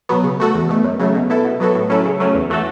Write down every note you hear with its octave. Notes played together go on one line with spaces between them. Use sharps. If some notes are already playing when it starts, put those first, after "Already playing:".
B2 F#3 B3
C#3
A3 F#4 A4
E2
B2 A3
F#2
C#3 F#3 A3
B2
B3 E4 A4
B2
F#3 B3 F#4 A4
A2
F#3 C#4 E4 A4
C#3
F#3 A3 C#4
E2
E3 A3 F#4 A4